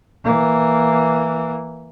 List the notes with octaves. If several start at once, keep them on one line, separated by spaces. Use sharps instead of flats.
E3 A#3